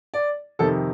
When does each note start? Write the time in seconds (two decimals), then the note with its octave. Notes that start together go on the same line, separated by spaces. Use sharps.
0.14 D5
0.59 F2 C3 D#3 A4